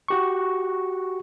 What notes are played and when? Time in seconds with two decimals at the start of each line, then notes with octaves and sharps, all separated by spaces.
0.08 F#4 G4 C#6